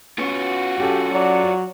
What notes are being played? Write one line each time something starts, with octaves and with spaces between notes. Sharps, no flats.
B3 C#4 F4 F#4
F#2 C#4 G4 A4
F#3 D5